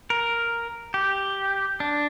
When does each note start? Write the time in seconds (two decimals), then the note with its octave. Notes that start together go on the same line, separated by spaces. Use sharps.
0.10 A#4
0.94 G4
1.80 D4